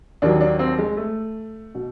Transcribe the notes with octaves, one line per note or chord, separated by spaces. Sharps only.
D#2 D#3 F#3 D4
D4
C4
G#3
A3
B2